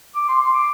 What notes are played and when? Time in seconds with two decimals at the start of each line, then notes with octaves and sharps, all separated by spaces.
0.15 D6
0.28 C6
0.41 C6
0.54 D6